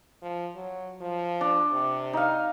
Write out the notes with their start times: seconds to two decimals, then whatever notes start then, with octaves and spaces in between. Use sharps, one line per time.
0.22 F3
0.55 F#3
1.01 F3
1.41 D4
1.73 C3
2.13 D#4 F5